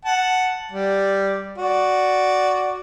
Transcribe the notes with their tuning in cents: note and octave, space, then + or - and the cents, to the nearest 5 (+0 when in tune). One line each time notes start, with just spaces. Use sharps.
F#5 +0 A5 +0
G3 +0 D5 +0
F#4 +0 D5 -5